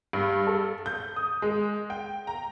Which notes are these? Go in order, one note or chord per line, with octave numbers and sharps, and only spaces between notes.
G2
A4
G6
D#6
G#3
G5
A#5